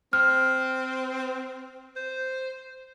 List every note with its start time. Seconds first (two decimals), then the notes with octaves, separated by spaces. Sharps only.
0.13 C4 F6
1.96 C5